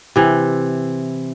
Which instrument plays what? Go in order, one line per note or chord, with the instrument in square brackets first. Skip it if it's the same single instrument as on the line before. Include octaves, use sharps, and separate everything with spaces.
[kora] C3 E3